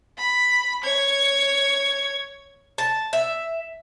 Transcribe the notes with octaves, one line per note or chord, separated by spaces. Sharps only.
B5
C#5 G#6
A5
E5